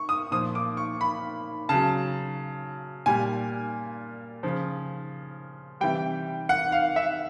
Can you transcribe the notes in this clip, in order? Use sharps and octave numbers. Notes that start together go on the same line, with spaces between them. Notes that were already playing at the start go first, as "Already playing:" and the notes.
Already playing: C#6
D#6
A#2 F3 D#6
D6
C#6
B5
C#3 F#3 A5
A#2 G3 G#5
C#3 F3
C3 E3 G3 G5
F#5
F5
E5